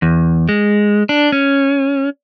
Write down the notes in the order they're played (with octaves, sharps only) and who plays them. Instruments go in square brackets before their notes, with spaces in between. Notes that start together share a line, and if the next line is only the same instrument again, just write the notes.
[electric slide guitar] E2
G#3
D4
C#4